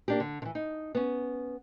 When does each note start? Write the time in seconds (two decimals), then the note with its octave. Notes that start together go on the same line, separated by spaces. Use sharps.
0.08 A#3 D4 G4
0.20 D3
0.42 D3 E3
0.55 D#4
0.95 B3 C#4